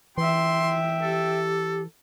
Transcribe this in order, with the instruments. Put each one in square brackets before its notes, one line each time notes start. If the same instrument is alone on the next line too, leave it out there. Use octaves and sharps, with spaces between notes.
[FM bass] E3 [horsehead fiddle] E5 G5 [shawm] C6
[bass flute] G4 [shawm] A4